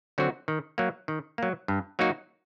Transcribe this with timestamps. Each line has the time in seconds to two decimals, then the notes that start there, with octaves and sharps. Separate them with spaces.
0.18 D3 F#3 C4 F#4
0.48 D#3
0.78 F#3 A#3
1.08 D#3
1.38 F#3 A#3
1.68 G2
1.99 F#3 A#3 D#4 F#4